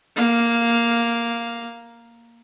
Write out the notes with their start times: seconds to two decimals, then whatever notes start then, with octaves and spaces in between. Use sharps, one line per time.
0.16 A#3 F5